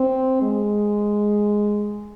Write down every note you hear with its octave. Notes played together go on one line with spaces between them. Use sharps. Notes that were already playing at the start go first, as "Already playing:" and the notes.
Already playing: C4
G#3